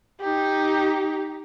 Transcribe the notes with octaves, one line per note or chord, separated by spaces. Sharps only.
D#4 G4